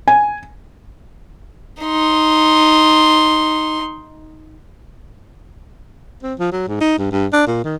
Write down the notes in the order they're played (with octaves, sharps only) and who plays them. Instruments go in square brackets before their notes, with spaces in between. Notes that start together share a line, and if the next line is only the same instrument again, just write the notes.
[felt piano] G#5
[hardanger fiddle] D#4 C6
[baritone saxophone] C4
F3
F#3
G#2
D#4
G2
G2
D4
A#2
D#3